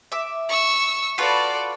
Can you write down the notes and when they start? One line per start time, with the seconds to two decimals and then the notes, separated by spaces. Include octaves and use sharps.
0.12 E5 D6
0.49 C#6 E6
1.18 F4 F#4 A4 B4 D5